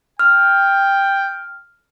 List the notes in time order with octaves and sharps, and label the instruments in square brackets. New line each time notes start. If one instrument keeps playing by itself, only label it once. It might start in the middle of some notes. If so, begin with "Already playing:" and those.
[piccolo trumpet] G5 [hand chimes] F6